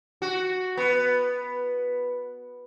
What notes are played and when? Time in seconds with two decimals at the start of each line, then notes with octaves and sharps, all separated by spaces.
0.22 F#4
0.77 B3